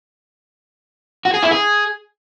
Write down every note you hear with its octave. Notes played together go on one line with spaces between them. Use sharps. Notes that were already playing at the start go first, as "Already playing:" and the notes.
F#4
G#4
E4
G#4